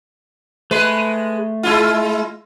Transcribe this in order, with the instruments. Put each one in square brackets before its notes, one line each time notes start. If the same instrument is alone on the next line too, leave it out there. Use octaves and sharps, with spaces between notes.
[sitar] G#3 B4 [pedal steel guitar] A3 C6
[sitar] G#3 E4 F4